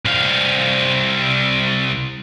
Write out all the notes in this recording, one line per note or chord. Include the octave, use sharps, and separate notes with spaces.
C2 F5